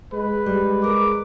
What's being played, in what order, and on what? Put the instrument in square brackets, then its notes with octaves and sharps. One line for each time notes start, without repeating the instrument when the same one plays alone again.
[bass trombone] G#3 [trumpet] B4
[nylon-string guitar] G3 [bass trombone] G#3
[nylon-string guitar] A#4 [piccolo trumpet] D6